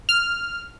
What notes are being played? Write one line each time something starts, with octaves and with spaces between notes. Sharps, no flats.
F6